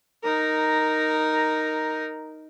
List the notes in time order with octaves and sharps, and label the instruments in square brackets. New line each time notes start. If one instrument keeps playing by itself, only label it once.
[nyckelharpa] D#4 A#4